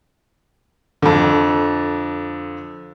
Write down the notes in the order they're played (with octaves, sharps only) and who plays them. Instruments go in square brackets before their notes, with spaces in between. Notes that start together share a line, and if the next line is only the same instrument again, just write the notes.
[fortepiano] F2 D3